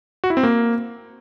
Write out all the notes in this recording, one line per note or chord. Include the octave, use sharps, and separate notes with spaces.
F#4
E4
C4
A#3